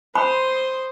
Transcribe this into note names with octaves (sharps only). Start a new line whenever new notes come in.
C5 B5 C6 D#6